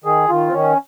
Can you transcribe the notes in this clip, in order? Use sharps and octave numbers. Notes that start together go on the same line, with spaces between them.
D#3 G#4
D#3 F4
C4
D#3 C#4